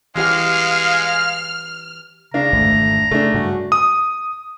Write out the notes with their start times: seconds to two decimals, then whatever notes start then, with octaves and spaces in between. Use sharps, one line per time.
0.16 E3 G#3 G4 F5 F#5 F6
2.34 C#3 D4 F5 A#5
2.53 G#1 F2 D3 A3
3.11 C#3 A3 D4
3.34 G2 C#3 F#3 F#4
3.72 D#6